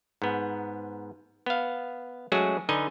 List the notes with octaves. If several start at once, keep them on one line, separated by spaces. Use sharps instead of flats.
G#2 B3
B3 F5
F#3 G#3 A3 C#4 F#4 G#4
D3 D#4 B4 D#5 G#5